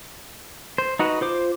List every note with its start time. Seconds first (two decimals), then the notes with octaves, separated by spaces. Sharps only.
0.78 C5
0.99 D#4 F#4 B4
1.21 F4 C5 D6